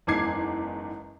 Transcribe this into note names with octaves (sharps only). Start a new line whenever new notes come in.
F#1 E2 G#2 D6 G#6 C7